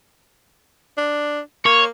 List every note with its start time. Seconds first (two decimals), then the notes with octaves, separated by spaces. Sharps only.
0.98 D4
1.66 A#3 C#5